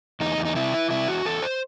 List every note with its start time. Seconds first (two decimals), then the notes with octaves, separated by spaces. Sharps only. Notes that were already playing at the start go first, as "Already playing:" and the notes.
0.20 E2 D#4
0.38 E2
0.45 D#4
0.55 C3 E4
0.72 E3
0.90 C3 E4
1.08 E2 F#4
1.25 E2 A4
1.42 C5